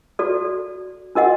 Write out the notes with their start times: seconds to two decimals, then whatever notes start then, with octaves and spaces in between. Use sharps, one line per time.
0.19 F#4 A4 D5
1.15 D4 F#4 A#4 D#5 F#5